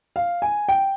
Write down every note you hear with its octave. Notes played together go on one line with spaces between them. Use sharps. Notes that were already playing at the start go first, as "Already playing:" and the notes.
F5
G#5
G5